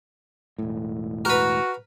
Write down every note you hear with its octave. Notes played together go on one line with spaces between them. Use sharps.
E1 A2
F#4 A#4 B4